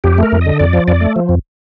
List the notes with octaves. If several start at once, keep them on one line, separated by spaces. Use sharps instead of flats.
F2 G4
A3 A#4
F2
D#5
D3
F2 D5
F3
F2 D5
A3
F3
F2